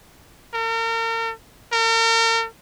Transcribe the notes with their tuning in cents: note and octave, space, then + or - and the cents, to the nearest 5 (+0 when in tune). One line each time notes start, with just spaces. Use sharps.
A#4 -40
A#4 -40